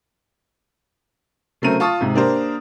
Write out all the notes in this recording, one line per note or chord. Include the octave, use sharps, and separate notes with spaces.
C#3 F#3 A3 C4 A#4 D#7
F4 A5 C#6 D#6
G#2 C3
A#3 D4 G4 A#4 C5